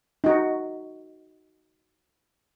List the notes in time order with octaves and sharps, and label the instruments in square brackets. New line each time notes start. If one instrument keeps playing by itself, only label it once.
[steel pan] D#4 F#4